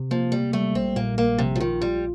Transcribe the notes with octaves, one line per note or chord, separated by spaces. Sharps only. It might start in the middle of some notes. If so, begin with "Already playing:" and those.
Already playing: C3
F3 A#3
G3 A#3
G3 A3
A#1 C4
A#2 A#3
A#1 A#3
A#1 C3
F3
D#3 F4
G3 F4